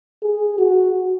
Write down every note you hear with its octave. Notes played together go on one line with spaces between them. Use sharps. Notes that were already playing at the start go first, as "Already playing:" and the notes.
G#4
F#4